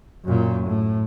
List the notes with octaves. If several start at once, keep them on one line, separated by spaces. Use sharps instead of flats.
F#2 A#2
A2